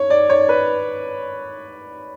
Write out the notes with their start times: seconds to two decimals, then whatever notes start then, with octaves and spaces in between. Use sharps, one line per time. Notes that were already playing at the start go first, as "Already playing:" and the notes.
Already playing: C#5
0.10 D5
0.30 C#5
0.49 B4